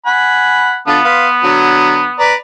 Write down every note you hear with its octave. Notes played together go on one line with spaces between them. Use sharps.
F#5 G#5 B5
D3 B3 F4 A4
B4 F5 C6
D3 F#3
B4 D5 A#5